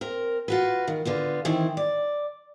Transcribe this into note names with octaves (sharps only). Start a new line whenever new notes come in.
C4 A#4
F4 F#4 B4
D#3
D3 B3 F4
D#3 E3 C4 E4
D5